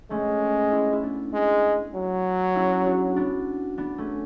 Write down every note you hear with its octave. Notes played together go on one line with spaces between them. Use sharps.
G#3 A3 C#4
C#4 E4
E4
B3 D4
G#3
F#3
C#4 E4
D4 F#4
B3 D4
B3 D4
A3 C#4